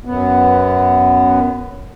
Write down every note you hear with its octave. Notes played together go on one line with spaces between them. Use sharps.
F#2 B3